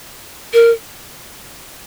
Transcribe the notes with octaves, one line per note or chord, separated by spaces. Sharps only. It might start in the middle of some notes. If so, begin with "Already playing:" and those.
A#4